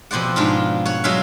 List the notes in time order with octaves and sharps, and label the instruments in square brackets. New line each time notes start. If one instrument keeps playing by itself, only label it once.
[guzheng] F2 B2 C5 D5 F#5
G#2 D4 F4
C#5 F#5
F#3 G#3 F4 E5 F5